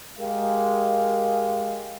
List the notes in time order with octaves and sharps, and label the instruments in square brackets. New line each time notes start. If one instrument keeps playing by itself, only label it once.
[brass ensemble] G#3 G4 A#4 F5